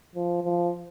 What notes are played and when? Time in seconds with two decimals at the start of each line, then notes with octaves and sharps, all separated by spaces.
0.15 F3
0.44 F3